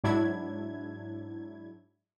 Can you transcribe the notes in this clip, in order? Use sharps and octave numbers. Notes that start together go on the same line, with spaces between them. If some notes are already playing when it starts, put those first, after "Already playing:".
G#2 F#3 D4 E4 G#6